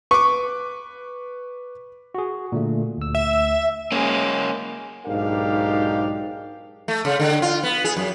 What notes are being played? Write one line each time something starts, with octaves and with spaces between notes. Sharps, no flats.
B4 C#6 D6
F#4 G#4
A#2 D3 A3
D2 E6
E5
G#3 A#3 C#4
B1 G#2 D4 G4 A#4 F5
A3
C#3
D3
F4
B3
G#4
F#2